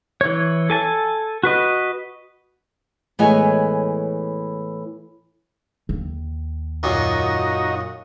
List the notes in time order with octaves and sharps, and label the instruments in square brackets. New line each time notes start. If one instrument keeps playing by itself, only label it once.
[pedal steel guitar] E3 C#5
A4 G#5 A5
F#4 B4 D#5
[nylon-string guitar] A2 E3 G#3 B3 C#5 G#5
[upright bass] D#2
[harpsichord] F#2 A#2 [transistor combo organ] D#4 F#4 D#5